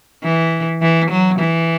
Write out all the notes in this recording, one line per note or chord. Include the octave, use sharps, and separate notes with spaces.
E3
E3
F#3
E3